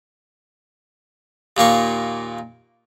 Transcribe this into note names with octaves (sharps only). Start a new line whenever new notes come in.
D#2 A#2 A#3 C#6